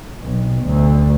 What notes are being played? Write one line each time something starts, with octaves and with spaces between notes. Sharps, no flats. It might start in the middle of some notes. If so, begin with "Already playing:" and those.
B1
D2